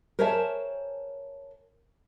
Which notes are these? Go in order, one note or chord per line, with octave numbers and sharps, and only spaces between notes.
A#4 C5 C#5 E5 G#5 A5